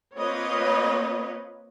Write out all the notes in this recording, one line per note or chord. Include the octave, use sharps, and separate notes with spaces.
A#3 C4 F4 B4 C#5 D#5